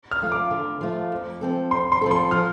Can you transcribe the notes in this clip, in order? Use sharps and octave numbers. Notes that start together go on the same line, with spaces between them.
F6
F3 A3 F4 A4
D6
D3
F3 A3 F4 A4
F2
F3 C4 A4
F2 C6
C6
F3 C4 A4
C6
F3 F6